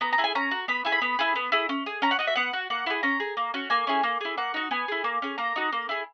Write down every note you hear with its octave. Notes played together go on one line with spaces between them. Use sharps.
B3 A#5
A#5
E4 G#4
G#5
C#4 A#5
F#4
B3 B5
E4 G#4
B5
B3
E4 G#4
B3
E4 G#4
C#4
G#4
C#4 A#5
F#5
F#4 D#5
E5
B3 F#5
F#4
A#3 F#5
E4 G#4
C#4 A#5
G#4
A#3
C#4 F#4
A#3 G#5
C#4 E4 G#4
A#3
E4 G#4
A#3 F#5
D#4 F#4
B3 G#5
E4 G#4
A#3
C#4 G#4
A#3 A#5
D#4 F#4
A#3
E4 G#4